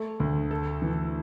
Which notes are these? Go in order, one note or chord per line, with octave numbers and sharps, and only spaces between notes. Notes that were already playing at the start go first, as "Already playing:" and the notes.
Already playing: A3
D2
A4
E3